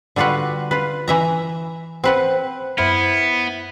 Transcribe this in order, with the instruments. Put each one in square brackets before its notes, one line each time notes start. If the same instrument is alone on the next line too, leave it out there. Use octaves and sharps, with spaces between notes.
[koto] D3 G3 F4 F#4 B4
F4 B4
E3 E5 A#5
C4 B4 F#5
[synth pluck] F#2 C5 F6 [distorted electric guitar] B3 [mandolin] E4